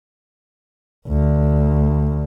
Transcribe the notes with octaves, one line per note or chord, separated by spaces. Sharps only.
D2